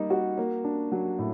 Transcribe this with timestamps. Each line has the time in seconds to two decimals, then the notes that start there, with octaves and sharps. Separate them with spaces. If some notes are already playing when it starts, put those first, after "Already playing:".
Already playing: G3 A#3 D#4
0.10 F#4
0.38 A#3
0.64 D4
0.92 F#3
1.19 A2